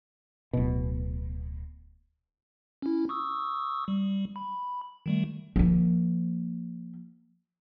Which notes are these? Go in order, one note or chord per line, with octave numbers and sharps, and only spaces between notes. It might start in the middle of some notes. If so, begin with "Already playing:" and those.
D1 B2
C#4 E4
C#6 D#6 E6
G3
B5
D#3 G3 A3
F3 A#3